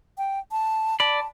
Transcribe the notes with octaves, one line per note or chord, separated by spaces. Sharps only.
G5
A5
D5 A5 B5